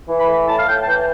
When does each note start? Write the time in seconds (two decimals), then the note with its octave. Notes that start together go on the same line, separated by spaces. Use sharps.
0.09 E3
0.18 B5
0.28 A3
0.47 A2 A5
0.58 F5
0.67 A2 G5
0.82 A5
0.87 E3 G5